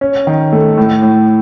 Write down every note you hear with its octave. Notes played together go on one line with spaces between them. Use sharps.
C#4
D#3
A3
A2
A2